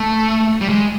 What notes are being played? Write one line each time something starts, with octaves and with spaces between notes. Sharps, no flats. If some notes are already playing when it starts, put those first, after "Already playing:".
Already playing: A3
G3
G#3